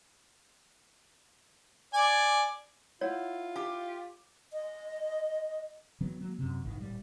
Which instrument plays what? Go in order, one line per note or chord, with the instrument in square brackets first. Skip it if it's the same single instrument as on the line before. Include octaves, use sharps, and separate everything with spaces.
[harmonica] D5 G#5
[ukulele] E4 F#5 [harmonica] F4 [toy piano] C#5
[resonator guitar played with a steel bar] G4
[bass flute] D#5
[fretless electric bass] D#3 E3 F#3 B3
F#3 A#3
F#2 C3
G1 C2 A2 D#3
D#1 B1 A2 G3